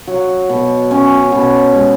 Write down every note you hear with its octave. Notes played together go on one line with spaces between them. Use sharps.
F#3
B2
C#4
B2
G#3